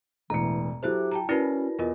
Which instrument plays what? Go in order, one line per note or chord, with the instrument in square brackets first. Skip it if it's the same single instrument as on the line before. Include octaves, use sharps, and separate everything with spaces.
[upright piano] E1 A2 C#7 [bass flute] E3 [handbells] A#5
[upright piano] F#3 E4 A4 [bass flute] G4 [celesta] C5 E5 F#6
[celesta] G5 A5 A#5
[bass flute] C#4 [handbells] E4 F#4 [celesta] A#4 B4 D5 [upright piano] A#6
[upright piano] E2 [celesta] F4 A#4 D#5